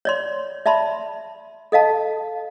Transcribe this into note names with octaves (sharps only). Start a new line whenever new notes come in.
C#5 D5 C6
D5 E5 A5 B5 C6
A4 D#5 F5 A5